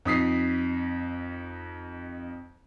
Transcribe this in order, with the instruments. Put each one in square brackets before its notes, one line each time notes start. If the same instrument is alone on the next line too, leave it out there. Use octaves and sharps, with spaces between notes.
[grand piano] F2 D#4 D#6 B6 C7